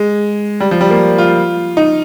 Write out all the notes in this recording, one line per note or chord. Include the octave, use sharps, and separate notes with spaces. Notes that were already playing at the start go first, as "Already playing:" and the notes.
Already playing: G#3
G3
F3
G3
A#3
F4
D#4